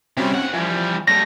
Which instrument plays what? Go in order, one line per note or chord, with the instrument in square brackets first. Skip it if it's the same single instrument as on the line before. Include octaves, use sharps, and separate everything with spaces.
[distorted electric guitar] C3 G3 [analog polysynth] C4 C#4 F#4
[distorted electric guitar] D#2 F#5
[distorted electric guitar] E3 G3 [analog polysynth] F3
[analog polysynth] F#3 [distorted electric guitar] G3 A3 [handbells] A#6